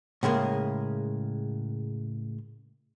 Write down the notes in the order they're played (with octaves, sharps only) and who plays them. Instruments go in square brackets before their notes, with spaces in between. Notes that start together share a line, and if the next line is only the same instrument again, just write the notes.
[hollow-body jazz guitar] A2 C#3 G#3 A#3